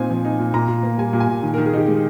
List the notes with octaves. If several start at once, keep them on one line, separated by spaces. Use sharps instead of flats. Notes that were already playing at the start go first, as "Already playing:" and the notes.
Already playing: A#2 C4 D#4 G#5
F3
D#4
A#2
A#2 A#5
A#2
A#3
G3 G#5
A#2
G#5
A#2
D#3
A#4
D#3
G#4
D#4 G4
G#3